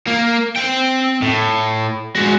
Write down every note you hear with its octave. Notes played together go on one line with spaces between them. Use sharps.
A#3
C4 G5
A2
G#3 F#4